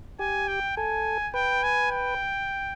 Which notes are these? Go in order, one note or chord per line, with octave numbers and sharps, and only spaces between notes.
G4 G#5
G5
A4 G#5
B4 G5
G#5
G5